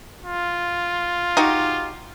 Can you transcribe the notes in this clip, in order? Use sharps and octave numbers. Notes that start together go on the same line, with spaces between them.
F4
D#4 F#4 G4